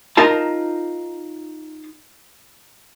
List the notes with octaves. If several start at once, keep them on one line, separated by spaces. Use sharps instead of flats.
D#4 F4 A#4 A5